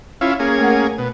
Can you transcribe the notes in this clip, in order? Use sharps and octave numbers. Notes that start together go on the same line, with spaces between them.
C#4 E4 F4
A#3 C#4 G#4
A3 A#4 F#5
B2